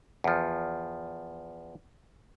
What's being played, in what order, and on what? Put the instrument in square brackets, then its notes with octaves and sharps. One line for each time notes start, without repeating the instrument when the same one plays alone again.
[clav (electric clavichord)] E2 F3